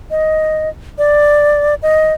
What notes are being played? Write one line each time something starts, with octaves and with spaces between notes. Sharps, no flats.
D#5
D5
D#5